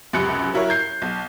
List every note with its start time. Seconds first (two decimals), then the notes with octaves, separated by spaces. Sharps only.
0.13 C#2 F#2 C3 F#6 C#7
0.54 F#3 E4 A#4 C#5
0.70 G6 C7
1.02 B1